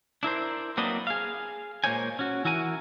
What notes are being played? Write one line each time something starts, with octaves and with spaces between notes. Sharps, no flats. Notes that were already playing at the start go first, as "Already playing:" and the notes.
D4 E4 A#4 C5
F#3 A#3 C4 D4 B4 D#5
G#4 F5
A#2 G#3 A#3 C5 C#5 G#5
C#4 F#4
E3 E4 F#4 A#4 G#5